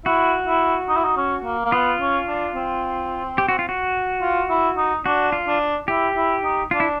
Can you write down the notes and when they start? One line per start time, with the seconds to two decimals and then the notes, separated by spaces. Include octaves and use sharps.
0.05 E4 F#4
0.47 E4
0.89 D#4
0.96 E4
1.04 D#4
1.17 C#4
1.44 A#3
1.65 A#3
1.72 B3 F4
2.00 C#4
2.28 D4
2.55 C4
3.38 G4
3.48 F#4
3.59 F4
3.69 F#4
4.22 F4
4.50 E4
4.77 D#4
5.05 D4 F#4
5.32 F4
5.47 D4
5.88 E4 G4
6.16 E4
6.43 D#4
6.71 D4 F4
6.80 E4